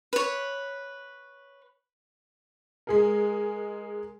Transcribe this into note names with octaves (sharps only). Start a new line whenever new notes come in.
B4 C#5
G#3 G#4 A#4